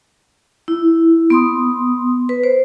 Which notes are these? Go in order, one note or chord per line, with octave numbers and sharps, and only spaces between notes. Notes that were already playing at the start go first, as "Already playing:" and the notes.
E4
B3 C6 D#6
B4
C5